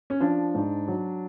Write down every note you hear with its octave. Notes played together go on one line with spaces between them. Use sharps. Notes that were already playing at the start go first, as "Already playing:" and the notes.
C#4
F3 D4
G#2
F#3